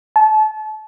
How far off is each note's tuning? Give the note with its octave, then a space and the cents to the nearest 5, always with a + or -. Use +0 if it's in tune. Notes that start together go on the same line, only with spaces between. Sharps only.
A5 -30